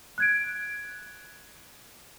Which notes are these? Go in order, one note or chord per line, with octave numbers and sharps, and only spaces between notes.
F#6 G#6 D7